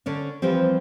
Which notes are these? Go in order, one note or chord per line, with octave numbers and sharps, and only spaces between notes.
D3 C#4 D4
E3 F3 G3 C4